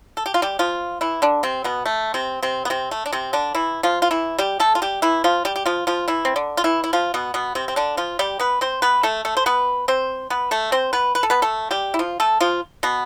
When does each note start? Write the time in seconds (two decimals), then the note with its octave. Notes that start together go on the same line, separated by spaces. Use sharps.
0.17 A4
0.26 G4
0.34 F4
0.42 G3 G4
0.59 F3 F4
1.01 E3 E4
1.22 D3 D4
1.43 C3 C4
1.64 B2 B3
1.86 A3
2.14 C3 C4
2.43 C3 C4
2.65 B3
2.70 C3 C4
2.91 A3
3.06 D4
3.12 C3 C4
3.33 D3 D4
3.55 E3 E4
3.83 F3 F4
4.02 F4
4.11 E3 E4
4.39 G3 G4
4.60 A3 A4
4.75 F4
4.82 G3 G4
5.02 E3 E4
5.24 F3 F4
5.45 G3 G4
5.56 G4
5.66 F3 F4
5.87 F3 F4
6.08 E3 E4
6.25 C4
6.36 D3 D4
6.57 F4
6.64 E3 E4
6.84 E4
6.93 F3 F4
7.14 B2 B3
7.34 B2 B3
7.55 C3 C4
7.68 C4
7.76 D3 D4
7.97 F3 F4
8.19 G3 G4
8.40 B3 B4
8.61 C4 C5
8.82 B3 B4
9.03 A3 A4
9.25 A3 A4
9.37 C5
9.46 B3 B4
9.88 C4 C5
10.30 B3 B4
10.51 A3 A4
10.72 C4 C5
10.93 B3 B4
11.15 B4
11.23 A4
11.30 B3 B4
11.42 A3 A4
11.71 G3 G4
11.94 E4
11.99 F3 F4
12.20 A3 A4
12.40 F3 F4
12.83 B2 B3